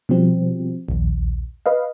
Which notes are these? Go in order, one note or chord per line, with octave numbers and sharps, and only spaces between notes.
B2 F3 G3 C4
A#1 D#2
B4 D#5 F5